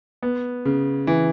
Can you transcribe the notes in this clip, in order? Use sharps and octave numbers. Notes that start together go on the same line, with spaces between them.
B3
C#3
E3